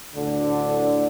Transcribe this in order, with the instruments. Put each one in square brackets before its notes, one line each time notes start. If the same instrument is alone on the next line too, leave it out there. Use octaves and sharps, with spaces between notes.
[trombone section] D2 A2 D3